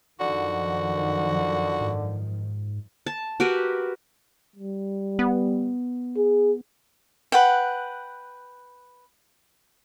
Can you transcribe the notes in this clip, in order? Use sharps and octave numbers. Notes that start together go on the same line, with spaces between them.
F#2 D3 D#3 F3 F#4
G#2
A5
F#4 G4 A#4 B4
G3
B3
G#4
B4 F#5 G5